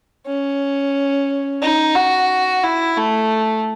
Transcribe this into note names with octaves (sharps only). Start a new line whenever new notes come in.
C#4
D#4
F#4
E4
A3